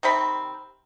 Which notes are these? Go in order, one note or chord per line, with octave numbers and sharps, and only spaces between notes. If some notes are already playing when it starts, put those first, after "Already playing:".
C3 D#3 C4 B5